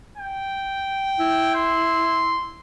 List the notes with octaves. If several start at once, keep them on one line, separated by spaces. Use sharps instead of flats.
G5
E4
C6